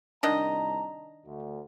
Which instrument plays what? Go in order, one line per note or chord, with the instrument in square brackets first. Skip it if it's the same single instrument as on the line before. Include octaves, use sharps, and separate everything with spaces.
[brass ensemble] C2 A5 A#5 [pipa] D#3 D4 D#5
[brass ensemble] D2